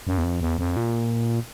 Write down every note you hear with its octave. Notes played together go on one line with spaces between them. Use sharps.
F#2
E2
F2
E2
F2
A#2